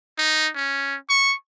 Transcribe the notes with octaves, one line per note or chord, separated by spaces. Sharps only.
D#4
C#4
C#6